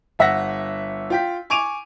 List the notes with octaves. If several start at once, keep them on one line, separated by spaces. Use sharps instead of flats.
G1 E5 F#5 A#6
F4 G5 B6
G#5 C#6 D6 D7 D#7 F7